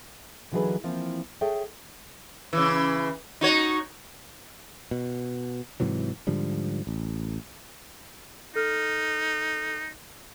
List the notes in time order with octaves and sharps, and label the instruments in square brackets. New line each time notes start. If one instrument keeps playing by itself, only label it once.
[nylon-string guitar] D3 E3 F#3 D#4 G#4 B4
E3 F3 A#3 C4
G#4 A4 C#5 E5 G5
[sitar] C#3 E3
D#4 F#4 C#5
[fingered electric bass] B2
G#2 C3 E3 F#3
G#2 D3 F3 G3
A1
[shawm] D#4 [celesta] A4 F6